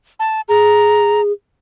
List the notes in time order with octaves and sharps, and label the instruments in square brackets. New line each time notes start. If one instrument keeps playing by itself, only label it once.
[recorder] A5
[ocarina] G#4 [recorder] A#5